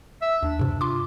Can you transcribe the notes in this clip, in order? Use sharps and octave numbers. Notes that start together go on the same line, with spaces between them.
E5
D#2 D4
G2 C3
F4 C6 D6